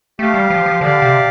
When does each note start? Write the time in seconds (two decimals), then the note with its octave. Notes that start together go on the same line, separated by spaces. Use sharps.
0.19 A3 G4 F5
0.34 G3
0.50 F3
0.66 F3
0.81 D3 G4 D5 F5
1.02 C3